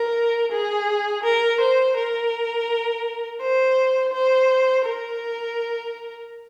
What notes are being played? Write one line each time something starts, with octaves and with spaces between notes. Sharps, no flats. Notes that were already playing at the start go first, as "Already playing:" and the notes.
Already playing: A#4
G#4
A#4
C5
A#4
C5
C5
A#4